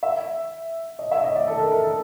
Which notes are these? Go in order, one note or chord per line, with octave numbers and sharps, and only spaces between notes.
E5
D#5
E5
D#5
D5
A4
A#4
A#4
A4